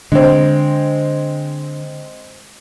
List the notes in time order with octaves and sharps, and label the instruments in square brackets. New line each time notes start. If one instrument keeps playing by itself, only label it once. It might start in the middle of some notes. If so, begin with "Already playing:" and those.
[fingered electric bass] D3 [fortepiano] G#3 C4